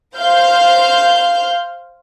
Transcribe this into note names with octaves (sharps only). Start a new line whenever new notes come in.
C5 F5 F6 G6